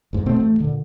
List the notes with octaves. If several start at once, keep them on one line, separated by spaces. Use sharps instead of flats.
F#1 G#2
B2 A3 C4
A1 A3
A#2 D3